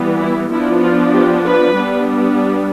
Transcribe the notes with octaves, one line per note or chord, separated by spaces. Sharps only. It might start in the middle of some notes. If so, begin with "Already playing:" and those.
Already playing: E3 G3 B3
E4
F3 B3 D4 E4
F4
G4
B4
G3 B3 D4